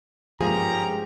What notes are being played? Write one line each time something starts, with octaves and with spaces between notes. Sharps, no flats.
G1 G#2 F3 A#3 C#4 G4 G#4 A#5